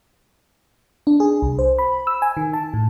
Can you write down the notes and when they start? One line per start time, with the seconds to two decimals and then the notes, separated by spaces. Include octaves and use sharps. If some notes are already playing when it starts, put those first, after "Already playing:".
1.07 D4
1.20 G#4
1.42 C2
1.59 C5
1.79 B5
2.07 E6
2.22 G#5
2.37 D#3
2.53 A5
2.74 A2